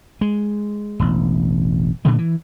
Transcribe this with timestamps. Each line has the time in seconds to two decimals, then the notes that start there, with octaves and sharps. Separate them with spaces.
0.21 G#3
1.00 E1 A1
2.05 A#2 D3 F#3 A3
2.18 E3